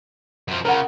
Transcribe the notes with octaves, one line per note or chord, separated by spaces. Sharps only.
F#2 F3
C#3 F4 A#4 F#5